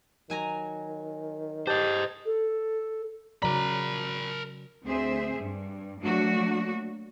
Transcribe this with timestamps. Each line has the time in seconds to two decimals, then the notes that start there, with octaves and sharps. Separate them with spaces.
0.30 D#3 F#3 G#5 A#5
1.67 G4 C5 D#5 A5 G6
2.26 A4
3.42 C#3 F#3 A#4 D5 A#5 B5
4.86 D2 C4 G#4 C5 E5
5.39 G2
6.01 F#3 A3 A#3 D4 F#4